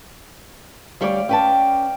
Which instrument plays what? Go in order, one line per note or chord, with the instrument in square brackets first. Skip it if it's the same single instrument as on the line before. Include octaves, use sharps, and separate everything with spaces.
[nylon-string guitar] D2 G3 C#5 [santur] D5 F5
[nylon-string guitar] C#4 B4 A5 [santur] G5